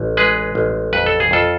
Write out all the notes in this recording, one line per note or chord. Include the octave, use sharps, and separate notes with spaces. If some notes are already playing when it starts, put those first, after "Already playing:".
Already playing: A1
G#3 G#4 B4
A1
F2 B4
A4
G#4
F2 F4 A4